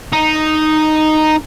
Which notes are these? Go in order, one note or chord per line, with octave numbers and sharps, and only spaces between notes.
D#4